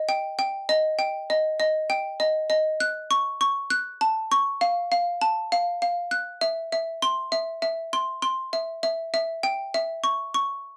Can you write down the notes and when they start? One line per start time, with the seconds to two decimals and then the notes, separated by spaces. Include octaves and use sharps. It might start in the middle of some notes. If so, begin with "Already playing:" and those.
Already playing: D#5
0.09 G5
0.39 G5
0.69 D#5
0.99 G5
1.30 D#5
1.60 D#5
1.90 G5
2.20 D#5
2.50 D#5
2.80 F#6
3.11 C#6
3.41 C#6
3.70 F#6
4.01 A5
4.32 C#6
4.61 F5
4.92 F5
5.21 A5
5.52 F5
5.82 F5
6.11 F#6
6.41 E5
6.72 E5
7.02 C6
7.32 E5
7.62 E5
7.93 C6
8.22 C6
8.53 E5
8.83 E5
9.14 E5
9.43 G5
9.74 E5
10.04 C#6
10.34 C#6